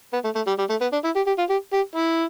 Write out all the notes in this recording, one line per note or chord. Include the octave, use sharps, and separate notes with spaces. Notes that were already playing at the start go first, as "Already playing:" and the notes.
B3
A3
A3
G3
G3
A3
B3
D4
E4
G4
G4
F4
G4
G4
E4